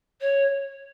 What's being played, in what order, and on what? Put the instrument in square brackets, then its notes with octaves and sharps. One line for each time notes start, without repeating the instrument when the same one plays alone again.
[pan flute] C#5